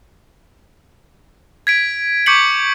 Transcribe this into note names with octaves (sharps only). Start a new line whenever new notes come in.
G#6 B6 D7
C#6 D6 G6 B6 C#7 F#7